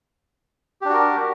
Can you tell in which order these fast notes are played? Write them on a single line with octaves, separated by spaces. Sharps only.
G4 D4 F#4 A#4